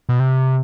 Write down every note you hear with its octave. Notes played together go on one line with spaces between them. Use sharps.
B2
C3